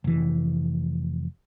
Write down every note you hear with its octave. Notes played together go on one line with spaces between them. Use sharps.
F1 E3